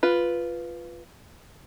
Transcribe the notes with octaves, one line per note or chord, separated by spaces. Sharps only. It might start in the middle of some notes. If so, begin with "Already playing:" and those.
F4 B4